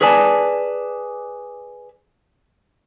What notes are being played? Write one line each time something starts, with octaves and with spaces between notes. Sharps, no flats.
G#4 B4 D5 G#5 A5